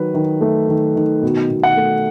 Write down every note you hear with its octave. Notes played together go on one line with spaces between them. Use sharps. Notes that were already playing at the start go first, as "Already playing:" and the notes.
Already playing: D#3 F#3 B4
D#3
A3
D#3
D#3
B2
B2
F#5
A3